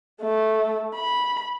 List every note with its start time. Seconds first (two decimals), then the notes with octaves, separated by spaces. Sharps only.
0.21 A3
0.95 B5